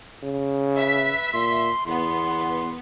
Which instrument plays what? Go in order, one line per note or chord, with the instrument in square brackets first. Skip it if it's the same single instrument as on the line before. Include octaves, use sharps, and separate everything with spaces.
[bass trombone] C#3
[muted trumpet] B4 [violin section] E5 B6
[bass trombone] A#2 [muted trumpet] C6
[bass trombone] E2 [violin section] B3 [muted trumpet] C6